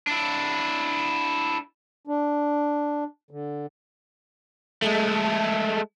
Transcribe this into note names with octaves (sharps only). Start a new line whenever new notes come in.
D4 E4
D4
D3
G#3 A3